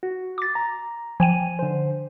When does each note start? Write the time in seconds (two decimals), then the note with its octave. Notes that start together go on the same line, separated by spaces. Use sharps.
0.03 F#4
0.38 D6 A6
0.55 A#5
1.20 F3 G5 G#5 D#7
1.59 D3 C5